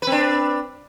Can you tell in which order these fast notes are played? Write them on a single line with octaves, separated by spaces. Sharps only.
B4 C4 D4